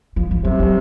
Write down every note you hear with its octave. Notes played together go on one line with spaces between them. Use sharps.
F3
F3
C3 F#3
F#3